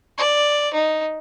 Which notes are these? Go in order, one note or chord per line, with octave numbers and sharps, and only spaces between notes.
D5
D#4